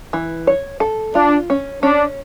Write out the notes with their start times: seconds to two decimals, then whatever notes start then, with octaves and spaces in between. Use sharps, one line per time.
0.13 E3
0.47 C#5
0.80 A4
1.15 D4 F4
1.50 C#4
1.83 C#4 D4